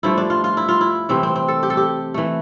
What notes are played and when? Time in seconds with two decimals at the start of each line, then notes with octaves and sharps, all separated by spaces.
0.03 G2 F3 A3 E4
0.18 D4
0.30 F4
0.44 F4
0.57 E4
0.69 F4
0.81 E4
1.09 C3 E3 A3 C4
1.23 C4
1.36 C4
1.48 A4
1.63 G4
1.70 A4
1.77 G4
2.14 E3 A3